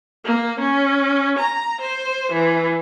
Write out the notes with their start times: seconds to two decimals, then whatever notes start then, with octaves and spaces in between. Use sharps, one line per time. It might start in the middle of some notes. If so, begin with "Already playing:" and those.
0.25 A#3
0.60 C#4
1.39 A#5
1.81 C5
2.32 E3